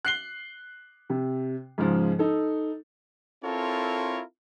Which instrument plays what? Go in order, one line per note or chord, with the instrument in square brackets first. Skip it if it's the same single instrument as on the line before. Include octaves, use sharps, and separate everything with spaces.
[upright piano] F#6 C7 G7
C3
G#2 C#3 F3 G#3
D#4 A4
[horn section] C4 E4 F4 A4 A#4 C#5